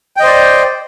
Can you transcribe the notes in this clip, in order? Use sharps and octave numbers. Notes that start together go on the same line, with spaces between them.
C5 D5 D#5 G5